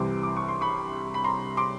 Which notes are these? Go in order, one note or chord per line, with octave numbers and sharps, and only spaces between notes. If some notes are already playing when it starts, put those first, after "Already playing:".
Already playing: C2 C3 E3 G3 C6 D6
D6
C#6
C6
B5 C#6
B5
A#5 C6
C6 D6